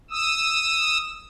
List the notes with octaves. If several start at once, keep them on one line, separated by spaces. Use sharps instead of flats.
D#6 E6